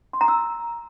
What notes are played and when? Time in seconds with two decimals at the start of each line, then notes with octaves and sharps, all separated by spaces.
0.13 C6
0.21 A#5
0.28 E6